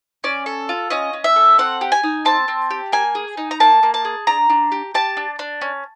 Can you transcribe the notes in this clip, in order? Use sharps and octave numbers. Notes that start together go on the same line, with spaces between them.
C#4 D5
A4
F4
C#4 D#5
C#4
E5
A4
C4 F#5
G4
G#5
D#4
C4 A5
C4
G4
A#3 G#5
G#4
D#4
A#5
A#3 A5
A#3
A5
G#4
D4 A#5
D4
G4
G4 A5
D4
D4
C#4